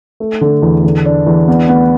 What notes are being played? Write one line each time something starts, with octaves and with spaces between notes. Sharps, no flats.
A3
D3
E2
D3
D4
E2
B3
B3